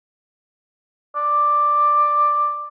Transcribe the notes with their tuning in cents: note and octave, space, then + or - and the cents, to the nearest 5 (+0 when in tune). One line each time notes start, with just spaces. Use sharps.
D5 +5